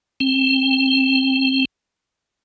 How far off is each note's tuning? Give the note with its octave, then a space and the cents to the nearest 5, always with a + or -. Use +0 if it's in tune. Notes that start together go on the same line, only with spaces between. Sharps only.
C4 +25